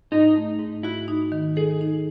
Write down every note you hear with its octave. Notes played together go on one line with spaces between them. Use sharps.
G#2 D#4
A3
G#2
E4 F#4
D#4
D#3
G#4 A4
D#4